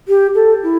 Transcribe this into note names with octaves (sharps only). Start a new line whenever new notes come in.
G4
A4
E4